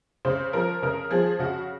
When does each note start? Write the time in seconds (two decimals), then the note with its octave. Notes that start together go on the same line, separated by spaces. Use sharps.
0.25 C#3 C5
0.53 F3 A#4
0.82 C#3 A#4
1.11 F3 G#4
1.39 C#3 F#4